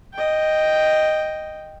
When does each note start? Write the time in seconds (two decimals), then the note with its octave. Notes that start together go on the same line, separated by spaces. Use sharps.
0.13 D#5 G5